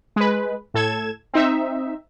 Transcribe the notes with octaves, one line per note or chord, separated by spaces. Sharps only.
G#3 B4
A2 A4 G#6 E7
C4 D#4 E5